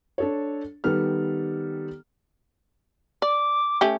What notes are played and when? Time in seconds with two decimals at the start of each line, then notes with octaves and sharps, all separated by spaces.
0.18 D4 A4 C#5
0.84 D#3 G3 B3 A4 F6
3.22 D5 D6
3.81 A3 C#4 G4